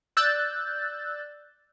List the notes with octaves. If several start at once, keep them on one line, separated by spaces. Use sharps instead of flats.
D5 E6 F#6 G6 A6